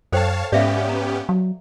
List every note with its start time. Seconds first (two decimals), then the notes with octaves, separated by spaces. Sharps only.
0.12 F#2 A4 C5 C#5 F5 G5 A5
0.52 G#2 B3 C#4 G4 D5 E5 F5
0.89 A#5
1.29 F#3